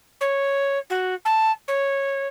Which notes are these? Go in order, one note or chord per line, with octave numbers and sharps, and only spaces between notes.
C#5
F#4
A5
C#5